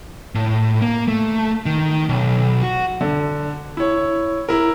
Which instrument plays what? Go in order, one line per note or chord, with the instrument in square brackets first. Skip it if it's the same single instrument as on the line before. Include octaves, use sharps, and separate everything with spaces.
[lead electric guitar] A2
A#3
A3
D#3
B1
F#4
[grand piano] D3
E4 C#5
E4 A#4